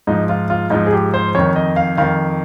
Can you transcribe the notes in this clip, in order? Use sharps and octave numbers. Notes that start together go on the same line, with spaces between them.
G#2 F3 D#4
F4
F4
G#2 F3 D#4
G#4
G4
C5
F2 D#3 C#5
D#5
F5
F2 D#3 F5